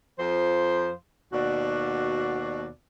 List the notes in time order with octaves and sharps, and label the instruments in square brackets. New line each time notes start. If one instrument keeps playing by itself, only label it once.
[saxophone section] F2 F3 C5
D#2 B2 F#4 D5